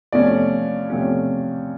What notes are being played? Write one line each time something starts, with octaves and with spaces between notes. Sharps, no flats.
E2 C3 F3 A3 C#4 D5
E2 C3 F3 A3 C#4